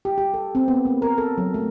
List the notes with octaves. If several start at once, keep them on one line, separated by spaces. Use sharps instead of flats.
G4
G4
A4
C4
B3
A#3
A#4
A4
F#3
A3